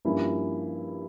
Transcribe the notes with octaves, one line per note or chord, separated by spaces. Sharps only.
G2 F3 A#3 C#4 E4